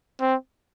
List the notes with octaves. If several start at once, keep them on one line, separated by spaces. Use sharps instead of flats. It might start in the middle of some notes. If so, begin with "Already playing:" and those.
C4